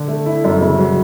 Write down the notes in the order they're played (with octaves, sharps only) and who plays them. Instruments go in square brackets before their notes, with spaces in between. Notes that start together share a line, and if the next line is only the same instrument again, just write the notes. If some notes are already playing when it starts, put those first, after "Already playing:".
Already playing: [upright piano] D3
A3
E4
F#2
C#3
F#3